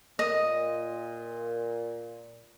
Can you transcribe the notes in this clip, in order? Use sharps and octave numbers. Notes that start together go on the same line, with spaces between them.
A#2 D#5